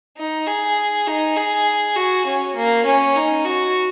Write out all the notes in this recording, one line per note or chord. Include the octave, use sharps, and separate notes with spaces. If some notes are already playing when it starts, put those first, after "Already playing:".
D#4
G#4
D#4
G#4
F#4
C#4
A#3
C#4
D#4
F#4